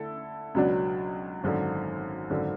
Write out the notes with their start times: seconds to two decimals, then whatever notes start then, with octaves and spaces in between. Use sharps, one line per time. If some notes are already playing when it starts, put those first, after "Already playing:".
Already playing: D3 A3 E4 A4
0.54 C#2 B2 F#3 B3 D4
1.43 G#1 F#2 D3
2.30 G#1 F#2 D3